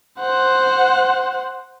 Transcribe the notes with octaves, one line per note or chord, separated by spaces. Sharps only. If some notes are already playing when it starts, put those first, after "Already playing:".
C5 F#5